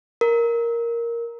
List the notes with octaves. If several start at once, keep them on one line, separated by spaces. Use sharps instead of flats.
A#4